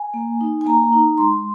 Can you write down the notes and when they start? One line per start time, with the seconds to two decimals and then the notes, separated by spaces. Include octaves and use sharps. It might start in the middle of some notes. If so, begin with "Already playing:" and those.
Already playing: G#5
0.14 A#3
0.41 D#4
0.61 G#5
0.66 A#3 A#5
0.93 D#4
1.18 G#3 C6